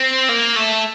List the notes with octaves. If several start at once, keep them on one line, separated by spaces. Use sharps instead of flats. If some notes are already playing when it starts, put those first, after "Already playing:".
Already playing: C4
A#3
A3